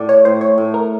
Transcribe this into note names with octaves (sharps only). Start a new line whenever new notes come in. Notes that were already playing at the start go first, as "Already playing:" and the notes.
Already playing: A2 D5
C#5
A2 C5
C#5
A2
A#4